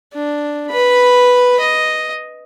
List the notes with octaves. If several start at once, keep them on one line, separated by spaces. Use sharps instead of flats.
D4
B4 B5
D#5